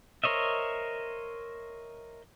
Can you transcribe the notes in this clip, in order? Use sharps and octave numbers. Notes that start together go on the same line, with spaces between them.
A#4 C5 C#5 D#5 E5